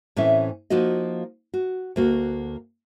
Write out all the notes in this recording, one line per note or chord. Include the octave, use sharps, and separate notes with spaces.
A2 E3 C4 C#4 E5
F3 A#3 D#4 F#4 D#5
F#4
D2 A#3 F#4